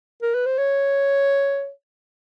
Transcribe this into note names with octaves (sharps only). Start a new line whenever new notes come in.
A#4
B4
C5
C#5